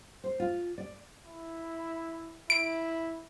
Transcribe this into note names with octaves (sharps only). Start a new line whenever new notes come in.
C5
F4
D5
E4
E4 D7